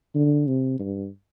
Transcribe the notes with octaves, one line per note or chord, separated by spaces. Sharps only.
D3
C3
G2